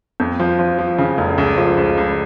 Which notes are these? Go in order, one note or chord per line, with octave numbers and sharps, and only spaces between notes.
F2
F3
F3
F3
C#3
F1
C#2
F3
C#2
C#2